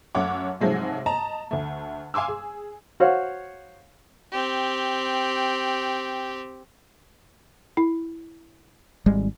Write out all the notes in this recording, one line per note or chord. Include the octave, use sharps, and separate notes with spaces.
F#2 A3 C#5 F#5 D6
G#2 C3 F3 F#3 G#3 A3
D#5 A5 A#5
D2 A3
F5 G#5 C6 D6 E6
G#4
F#4 C5 C#5 F5 F#5
C4 G4
E4
G#1 G3 G#3